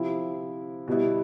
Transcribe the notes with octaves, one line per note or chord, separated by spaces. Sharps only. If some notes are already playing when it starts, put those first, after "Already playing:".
Already playing: C3 F3 C4 E4
B2 G3 B3 E4